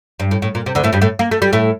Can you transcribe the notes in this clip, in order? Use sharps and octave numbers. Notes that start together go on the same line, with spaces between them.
G2
A2
A2
A#2
C3
D2 D3
A2 A3
G2 G3
A2 A3
A#3
A3
G3
A2 A3